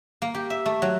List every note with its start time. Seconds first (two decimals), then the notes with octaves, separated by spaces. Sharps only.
0.22 A#3
0.34 G4
0.50 E5
0.66 A3
0.82 F#3